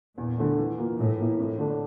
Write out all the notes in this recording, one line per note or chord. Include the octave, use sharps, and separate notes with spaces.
E2 A#2
D3 A3
E3
A#3 F4
A2 E3
A#3 E4
F2 A2
D3 A3 D4